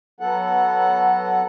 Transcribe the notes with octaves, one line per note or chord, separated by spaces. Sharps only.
F#3 B3 A4 F#5